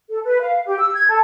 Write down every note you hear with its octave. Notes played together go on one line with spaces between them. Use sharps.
A4
B4
F5
G4
E6
G#6
A4